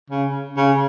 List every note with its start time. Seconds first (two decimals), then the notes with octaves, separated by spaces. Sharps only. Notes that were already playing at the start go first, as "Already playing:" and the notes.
0.10 C#3
0.57 C#3